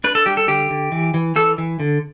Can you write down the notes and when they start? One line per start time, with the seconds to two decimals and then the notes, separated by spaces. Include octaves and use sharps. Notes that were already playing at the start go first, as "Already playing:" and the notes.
0.04 D4 B4
0.15 A4
0.26 G3 G4
0.37 A4
0.48 D3 G4
0.70 D3
0.92 E3
1.14 E3
1.36 E3 A4
1.58 E3
1.80 D3